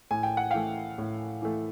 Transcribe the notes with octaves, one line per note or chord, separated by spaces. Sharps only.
A2 G#5
G5
F#5
E3 A3 F5 G5
A2
E3 A3